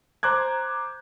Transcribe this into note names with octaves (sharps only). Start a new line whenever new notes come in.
C5 A#5 D6 F#6 G#6